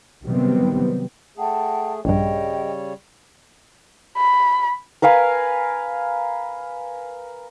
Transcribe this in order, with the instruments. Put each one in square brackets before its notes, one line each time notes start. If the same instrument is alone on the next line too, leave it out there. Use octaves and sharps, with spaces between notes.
[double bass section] C3 D#3 F#3 G3 B3 C4
[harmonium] A3 G#4 [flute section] F#5 G5 A5
[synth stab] A#1 G2 [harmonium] C#3 G3 C#5 [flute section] G#4 D#5 G5
[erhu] B5
[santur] A#4 B4 F5 G#5